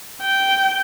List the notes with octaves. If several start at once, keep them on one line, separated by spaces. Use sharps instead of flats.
G5